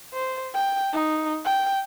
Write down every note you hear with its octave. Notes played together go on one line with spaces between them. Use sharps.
C5
G5
D#4
G5